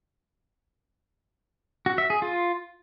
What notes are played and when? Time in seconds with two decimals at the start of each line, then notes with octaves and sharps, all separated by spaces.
1.86 F#4
1.98 E5
2.10 G#4
2.22 F4